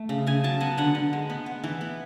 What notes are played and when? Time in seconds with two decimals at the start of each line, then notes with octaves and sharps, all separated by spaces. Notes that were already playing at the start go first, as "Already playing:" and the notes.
Already playing: A3
0.09 C#3
0.27 C#3 G#5
0.44 F#3 A5
0.60 B3 G#5
0.77 D3 F#5
0.95 D3
1.13 G#3
1.30 B3
1.46 B3
1.64 E3
1.81 B3